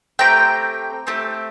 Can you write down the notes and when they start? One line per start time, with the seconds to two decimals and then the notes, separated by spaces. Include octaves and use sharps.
0.19 A3 C4 G4 G5 A#5
1.07 A3 C4 G4